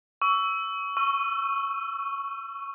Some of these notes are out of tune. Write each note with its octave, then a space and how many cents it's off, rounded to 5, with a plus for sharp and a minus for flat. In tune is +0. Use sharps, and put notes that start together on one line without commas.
C#6 +25 E6 +0
C#6 +0 E6 +40